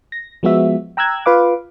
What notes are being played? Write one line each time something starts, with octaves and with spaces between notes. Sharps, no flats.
A#6
F3 G#3 B3 F#4 E5
G5 A#5 E6 F#6 G#6
F4 B4 F5 D6